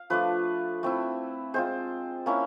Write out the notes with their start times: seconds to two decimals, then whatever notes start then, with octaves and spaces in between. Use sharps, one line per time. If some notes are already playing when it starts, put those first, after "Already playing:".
Already playing: F5
0.10 F3 A3 D4 B4
0.83 A3 C4 E4
1.54 G#3 C4 F4 C5
2.26 A#3 C#4 E4